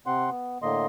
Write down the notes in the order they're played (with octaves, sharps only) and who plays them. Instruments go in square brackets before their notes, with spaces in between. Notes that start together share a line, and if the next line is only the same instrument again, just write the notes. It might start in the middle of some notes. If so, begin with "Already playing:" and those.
[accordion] C3 C4 F#5 C6
B3
A2 D3 A#3 D#5 C6